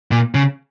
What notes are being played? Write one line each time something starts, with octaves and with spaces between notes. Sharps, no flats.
A#2
C#3